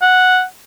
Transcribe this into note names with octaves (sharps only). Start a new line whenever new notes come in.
F#5